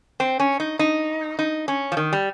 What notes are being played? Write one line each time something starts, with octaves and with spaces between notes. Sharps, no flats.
C4
C#4
D#4
D#4
D#4
C#4
F3
D#3
G3